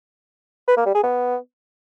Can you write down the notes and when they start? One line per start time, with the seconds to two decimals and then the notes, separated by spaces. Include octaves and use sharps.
0.68 B4
0.77 A#3
0.86 G3
0.95 G#4
1.04 B3